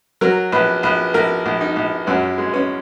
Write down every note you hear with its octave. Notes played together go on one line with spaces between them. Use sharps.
F#3 A#4
A#1 B4
A#1 B4
A#1 A#4
A#1
D#4
A#1
F#2 C#4
G#3
C#4